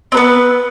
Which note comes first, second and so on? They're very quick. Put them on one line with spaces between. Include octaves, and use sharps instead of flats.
C4 B4 B3